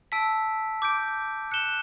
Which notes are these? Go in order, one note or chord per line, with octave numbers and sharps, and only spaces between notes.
A5 E6 B6 D7
D6 G6 D7
F#6 C#7 E7 G7